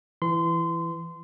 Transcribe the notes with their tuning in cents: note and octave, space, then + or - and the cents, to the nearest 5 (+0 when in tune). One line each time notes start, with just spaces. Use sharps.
E3 +15 C6 -25